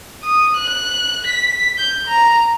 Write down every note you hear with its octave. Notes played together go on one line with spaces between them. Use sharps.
D#6
F#6
B6
G6
A#5